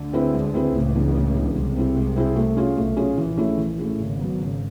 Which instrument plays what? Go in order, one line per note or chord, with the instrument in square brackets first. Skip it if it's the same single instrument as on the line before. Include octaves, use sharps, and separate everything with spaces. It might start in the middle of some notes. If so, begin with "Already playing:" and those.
Already playing: [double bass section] D2 D3
[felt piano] C4 E4 G#4 B4
G#3
C4 E4 G#4 B4
[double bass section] C#2 C#3 [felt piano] A2
[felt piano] E3 G#3 B3 D4
A2
E3 G#3 B3 D4
[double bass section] C2 C3 [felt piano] G#3
[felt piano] C4 E4 G#4
G#3
C4 E4 G#4
A3
C#4 F4 G#4
[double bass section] B1 B2 [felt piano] A3
[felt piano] C#4 F4 G#4
[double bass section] A#1 A#2 [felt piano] E3
[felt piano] A3 C#4 E4 G#4
E3
A3 C#4 E4 G#4
[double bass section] G#1 G#2 [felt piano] C#3
[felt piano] F#3 B3
C#3